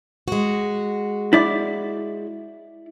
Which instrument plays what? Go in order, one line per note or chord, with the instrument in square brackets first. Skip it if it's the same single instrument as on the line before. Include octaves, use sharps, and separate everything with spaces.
[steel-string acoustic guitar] G#3 F#4
[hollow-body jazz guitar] E4 D5